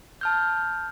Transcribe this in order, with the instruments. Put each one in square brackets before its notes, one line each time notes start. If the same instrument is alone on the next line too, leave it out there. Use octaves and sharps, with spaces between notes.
[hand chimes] A5 F6 G6